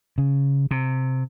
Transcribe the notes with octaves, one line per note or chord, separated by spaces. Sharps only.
C#3
C3